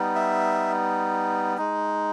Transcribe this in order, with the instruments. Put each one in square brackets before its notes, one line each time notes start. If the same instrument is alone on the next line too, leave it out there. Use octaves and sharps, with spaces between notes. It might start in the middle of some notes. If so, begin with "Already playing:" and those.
Already playing: [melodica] G3 B3 D#4
E5
G#3 D#4